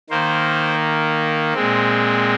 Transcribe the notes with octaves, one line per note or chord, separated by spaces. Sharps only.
D#3 A#3 C5
A#2 G#3 C4